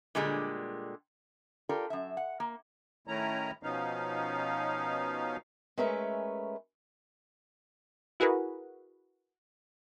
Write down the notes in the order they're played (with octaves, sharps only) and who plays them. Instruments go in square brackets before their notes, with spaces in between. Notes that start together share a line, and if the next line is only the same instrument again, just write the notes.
[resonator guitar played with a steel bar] A#2 D3 G3 G#3
F4 G4 A4 A#4 D5
F#2 E5
F#5
A#3
[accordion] A2 D#3 A3 C#4 E4 A#5
B2 F3 B3 C#4 D#4 F5
[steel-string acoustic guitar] G#3 A3 C#4 A#4 B4 E5
[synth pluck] E4 F#4 G#4 A#4 B4